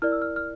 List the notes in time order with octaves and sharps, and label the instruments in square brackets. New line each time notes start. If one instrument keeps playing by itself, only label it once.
[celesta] E4 A#4 D5 F6
E6
F6
F6